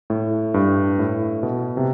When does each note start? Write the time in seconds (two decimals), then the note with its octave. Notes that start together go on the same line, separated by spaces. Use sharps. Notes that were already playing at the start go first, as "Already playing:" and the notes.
0.10 A2
0.54 G2
0.99 A2
1.43 B2
1.77 C3